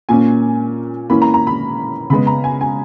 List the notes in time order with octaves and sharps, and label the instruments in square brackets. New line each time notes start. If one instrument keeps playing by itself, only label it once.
[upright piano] A#2 A#3 C#4 G#5
E3 A#3 C#4 B5
A#5
A#5
B5
C#3 G#3 B3 B5
A#5
G#5
G#5